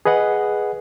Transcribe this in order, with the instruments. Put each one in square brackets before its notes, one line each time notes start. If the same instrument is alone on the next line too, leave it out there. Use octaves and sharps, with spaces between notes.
[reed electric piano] G#4 B4 D#5 F#5